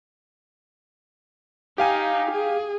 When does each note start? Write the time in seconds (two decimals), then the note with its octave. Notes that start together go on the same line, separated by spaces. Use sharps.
1.78 D#4 G4 F5 G#5
2.31 G#4